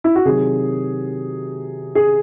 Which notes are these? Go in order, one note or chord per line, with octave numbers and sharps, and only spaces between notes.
E4
F#4
C3 D#3 F#3 G#4
G#4